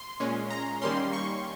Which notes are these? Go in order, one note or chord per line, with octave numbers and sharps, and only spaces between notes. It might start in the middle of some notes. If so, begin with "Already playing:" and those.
Already playing: C6
A#2 G#3 C#4
A#5
D#3 G3 A#3 C#4 C6
C#6